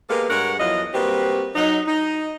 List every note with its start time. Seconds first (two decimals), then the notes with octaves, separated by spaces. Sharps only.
0.10 G#3 A#3 B3 G4 A4 F5
0.30 G2 G#3 A#4 C#5 F#5
0.60 E2 F3 F#3 E4 D#5 F5
0.94 G3 A#3 C4 F#4 G4 B4
1.56 F#3 D#4
1.88 D#4